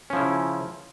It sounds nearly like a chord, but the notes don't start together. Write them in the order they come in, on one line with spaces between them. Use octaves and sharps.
C#4 F3 E4 C#3